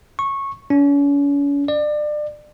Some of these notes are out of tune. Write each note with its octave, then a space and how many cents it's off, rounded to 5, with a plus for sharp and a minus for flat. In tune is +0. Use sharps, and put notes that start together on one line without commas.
C#6 -15
C#4 +40
D5 +30